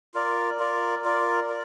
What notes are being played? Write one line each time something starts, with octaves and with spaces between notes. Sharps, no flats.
F4 A#4 D5
F4 A#4 D5
F4 A#4 D5
A#4 D5